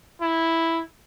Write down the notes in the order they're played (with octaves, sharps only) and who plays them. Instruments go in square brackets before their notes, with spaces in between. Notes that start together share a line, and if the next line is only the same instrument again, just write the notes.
[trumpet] E4